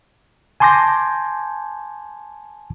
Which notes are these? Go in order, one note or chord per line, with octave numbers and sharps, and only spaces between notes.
G#5 A5 C6 D6 G6 A#6